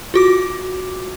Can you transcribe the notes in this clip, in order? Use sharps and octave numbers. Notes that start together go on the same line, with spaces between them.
F4 F#4 D6